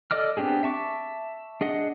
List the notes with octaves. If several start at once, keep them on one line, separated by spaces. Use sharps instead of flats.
A4 D5 D#5 D6 F6
B3 C4 D4 G4 G#4
E5 A5 C#6 D6
D4 G#4 D#5 F#5